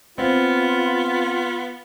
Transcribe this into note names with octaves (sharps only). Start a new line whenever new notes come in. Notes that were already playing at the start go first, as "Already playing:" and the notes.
B3 C4 F4